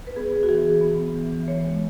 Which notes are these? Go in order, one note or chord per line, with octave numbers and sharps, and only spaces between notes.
B4
B3 G#4
B3
F#4
E3 G#4
E3
B3
B3
E3
E3
E3 C#5
G#3